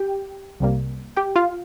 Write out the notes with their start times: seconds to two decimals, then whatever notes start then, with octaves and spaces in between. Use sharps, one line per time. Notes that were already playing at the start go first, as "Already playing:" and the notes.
Already playing: G4 G5
0.60 C2 C3 G3 A#3
1.17 G4 G5
1.36 F4 F5